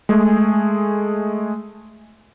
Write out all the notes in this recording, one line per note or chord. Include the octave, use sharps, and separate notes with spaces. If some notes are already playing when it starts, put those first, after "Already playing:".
G#3 A3 G#4